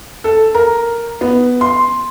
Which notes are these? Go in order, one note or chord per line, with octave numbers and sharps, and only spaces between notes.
A4
A#4
B3
C6